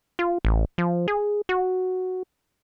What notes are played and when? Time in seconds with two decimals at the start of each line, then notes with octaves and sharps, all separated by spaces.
0.19 F4
0.45 A1
0.78 F3
1.08 G#4
1.49 F#4